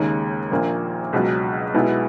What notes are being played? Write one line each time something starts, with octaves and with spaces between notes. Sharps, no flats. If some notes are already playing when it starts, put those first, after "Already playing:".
Already playing: D#2 C#3 G#3 D#4
A#1 A#2 A#3
C#2 B2 F#3
B1 B2 G#3 B3 E4